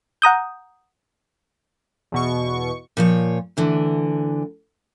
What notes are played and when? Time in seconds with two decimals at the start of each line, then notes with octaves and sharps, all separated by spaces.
0.22 F#5 A#5 D#6 G6
2.12 E2 B2 C#6
2.97 A#2 F3 C#5
3.57 D2 D3 E3